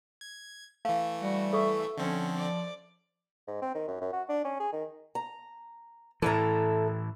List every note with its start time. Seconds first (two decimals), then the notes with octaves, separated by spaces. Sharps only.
0.21 G#6
0.85 E3 A3 F5
1.22 G3 F#4
1.53 A4 E5 C#6
1.97 D3 F3 C4 C#4
2.37 D5
3.47 G#2
3.62 C4
3.75 D#3
3.88 F#2
4.01 F#2
4.13 F#4
4.29 D4
4.44 C#4
4.60 G#4
4.73 D#3
5.15 A#5
6.22 A2 E3 A4 E5 A#5